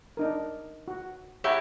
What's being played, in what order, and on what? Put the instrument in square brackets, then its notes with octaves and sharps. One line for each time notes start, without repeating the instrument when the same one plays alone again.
[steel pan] D4 D#4 A#4
F#4
[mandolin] E4 G4 C#6 [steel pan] C#5 F#5 A#5